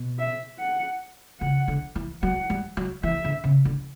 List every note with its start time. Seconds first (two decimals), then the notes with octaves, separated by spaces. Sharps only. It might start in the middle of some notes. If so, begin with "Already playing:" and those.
Already playing: B2
0.19 E5
0.59 F#5
1.40 C#3 F#5
1.68 D3
1.96 E3
2.22 F#3 F#5
2.50 G3
2.77 F#3
3.03 E3 E5
3.25 D3
3.44 C#3
3.65 D3